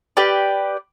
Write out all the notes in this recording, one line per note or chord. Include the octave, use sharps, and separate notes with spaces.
G4 B4 D5